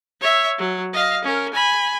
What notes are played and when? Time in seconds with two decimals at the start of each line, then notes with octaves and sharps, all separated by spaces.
0.21 C#5 E5
0.58 F#3
0.93 D#5 F5
1.25 C#4 A#4
1.54 G#5 B5